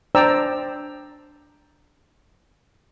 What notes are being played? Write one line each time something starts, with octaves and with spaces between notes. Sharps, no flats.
D4 C5 D5 G5 A#5 E6